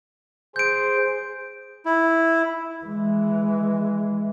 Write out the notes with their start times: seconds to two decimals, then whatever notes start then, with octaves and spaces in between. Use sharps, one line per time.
0.56 G#4 C5 G6 D7
1.86 E4
2.85 E3 G#3